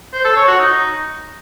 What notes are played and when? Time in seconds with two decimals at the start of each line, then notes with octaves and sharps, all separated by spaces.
0.13 C5
0.25 A4
0.36 C#5
0.48 F#4
0.59 D#4